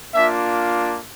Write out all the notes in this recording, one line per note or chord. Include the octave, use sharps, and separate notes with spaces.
A#3 D4 F4 E5